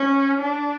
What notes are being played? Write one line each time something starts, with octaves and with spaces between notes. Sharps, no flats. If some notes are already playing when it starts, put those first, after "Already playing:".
Already playing: C#4
D4